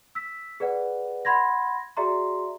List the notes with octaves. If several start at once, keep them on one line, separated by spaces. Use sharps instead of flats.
E6 B6
G#4 B4 D5 F#5
F#5 B5 C6 G#6 A#6
F#4 G#4 D5 E5 A#5 C6